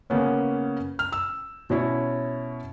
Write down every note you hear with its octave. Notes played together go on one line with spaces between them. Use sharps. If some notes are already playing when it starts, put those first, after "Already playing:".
C#3 A#3 B3 C#4
F6
E6
B2 C#4 E4 C#5